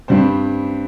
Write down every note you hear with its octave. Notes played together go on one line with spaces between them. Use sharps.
G2 G3 C4 C5